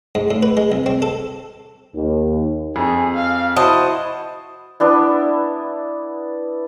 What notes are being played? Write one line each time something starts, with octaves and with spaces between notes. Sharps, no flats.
G#2
A2
B4
G#3
C2
C4
A4
D#2
F2 G#4
F5
E4 F#4 C5 D#5 A5
B3 D4 E4